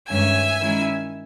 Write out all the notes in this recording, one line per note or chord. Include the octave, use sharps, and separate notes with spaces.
G2 D#3 G#3 C#4 E5 G#5
D#3 G#3 C#4 E4